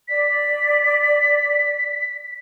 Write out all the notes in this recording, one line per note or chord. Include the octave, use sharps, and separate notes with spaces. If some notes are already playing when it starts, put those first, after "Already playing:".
D5 B6